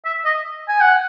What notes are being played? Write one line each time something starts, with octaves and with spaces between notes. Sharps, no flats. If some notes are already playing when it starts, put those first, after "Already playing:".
E5
D#5
G#5
F#5